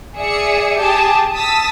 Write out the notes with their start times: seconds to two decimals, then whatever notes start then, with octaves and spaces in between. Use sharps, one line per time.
0.16 G#4 D5 E5 C#7
0.77 G4 G#4 A5
1.34 A5 D#6 E6 A6 B6